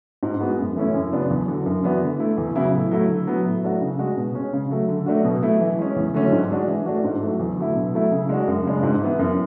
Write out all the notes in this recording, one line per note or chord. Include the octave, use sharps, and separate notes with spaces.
G#2
G#3 B3 F#4
F#2
E3 A3 C#4 E4
F#2
C#3 F#3 B3 D4
E2
D3 F#3
F#2
E3 B3 D4 F#4
D3
A3 E4
E2
C#3 F#3 B3 E4
A2
F#3 A3 E4
D3
F#3 B3
A2
F#3 A3 D4 F#4
C#3
G#3 D4 F#4
B2
G#3 C#4
C#3
F#3 A3
D3
F#3 A3 D4 F#4
B2
F#3 A3 E4
E3
G#3 C#4
E2
D3 F#3 A3 C#4
G#2
G#3 D4 F#4
E3
A3 D4 F#4
G#2
F#3 A3
E2
D3 F#3 A3 E4
B2
F#3 A3 E4
C#3
G#3 D4 F#4
F#2
C#3 G#3 D4
G#2
E3 B3 E4
F#2